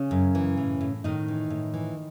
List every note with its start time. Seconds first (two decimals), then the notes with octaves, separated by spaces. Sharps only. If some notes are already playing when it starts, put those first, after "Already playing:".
Already playing: C#3 C#4
0.11 F#2
0.35 E3
0.57 A2
0.81 A2
1.04 A2 D#3 D#4
1.28 E3
1.50 A2
1.74 E3